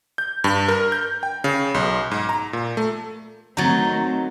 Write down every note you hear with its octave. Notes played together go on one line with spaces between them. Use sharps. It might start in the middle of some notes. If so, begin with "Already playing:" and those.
G6
G2
A#4
G6
G5
C#3
B1
G#2
A#5
A#2
A3
D#3 F#3 A3 C4 D#4 A#5 A6